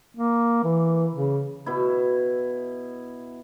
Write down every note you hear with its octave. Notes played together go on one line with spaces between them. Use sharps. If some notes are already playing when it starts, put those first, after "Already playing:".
A#3
E3
C#3
B2 E4